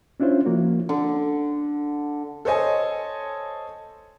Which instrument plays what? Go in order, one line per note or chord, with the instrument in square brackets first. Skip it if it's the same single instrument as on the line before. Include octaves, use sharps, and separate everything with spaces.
[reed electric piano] C#4 D4 E4 F4 C5 C#5
F3 A#3 F#4
[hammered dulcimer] D3
[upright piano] A4 C5 C#5 D#5 G#5 A5